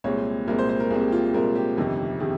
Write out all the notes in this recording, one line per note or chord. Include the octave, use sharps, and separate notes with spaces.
C2 A#2 G#3 C4 C#5
C2 A#2 G#3 C4 A#4
C5
C5
A#4
C2 A#2 G#3 C4 G#4
G4
F4
C2 A#2 G#3 C4 A#4
G4
G1 F2 C3 D#3
C3 D#3 G#4